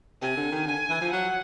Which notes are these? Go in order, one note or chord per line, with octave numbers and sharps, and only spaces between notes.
C3 G#5
D3
D#3
D3 G#5
E3
F3
F#3 F#5